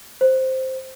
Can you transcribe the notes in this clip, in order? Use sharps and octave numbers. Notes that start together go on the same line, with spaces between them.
C5